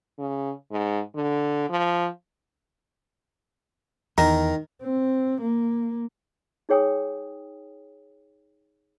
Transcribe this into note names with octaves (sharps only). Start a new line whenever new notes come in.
C#3
G#2
D3
F3
E2 D#3 A#4
C4
A#3
D#4 G#4 C#5 G5 G#5 D#6